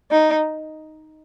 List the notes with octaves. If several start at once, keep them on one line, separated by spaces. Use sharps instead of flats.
D#4